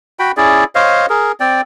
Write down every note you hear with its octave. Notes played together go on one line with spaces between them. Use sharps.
F#4 G5 B5
C#4 E4 G#4 D5
C5 C#5 D#5 F5
G#4 A#4
C4 D5 G5